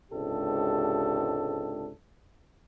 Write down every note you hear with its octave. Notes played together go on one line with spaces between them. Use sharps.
C#2 G#2 C3 D4 G4 A4